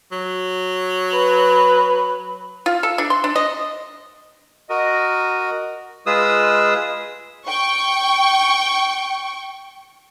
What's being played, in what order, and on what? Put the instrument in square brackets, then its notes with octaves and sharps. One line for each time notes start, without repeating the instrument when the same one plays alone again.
[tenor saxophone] F#3
[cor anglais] B4
[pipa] F4
A4
D4
C6
D4
D#5
[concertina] F#4 A#4 [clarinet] D#5
[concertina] G#3 F4 G#4 B4 D#6 E6
[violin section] G5 C#6